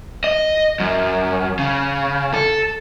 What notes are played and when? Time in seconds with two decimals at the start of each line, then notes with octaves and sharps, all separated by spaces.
0.24 D#5
0.80 F#2
1.59 C#3
2.34 A4